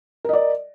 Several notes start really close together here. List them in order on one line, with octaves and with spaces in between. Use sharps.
A#4 D#5 D5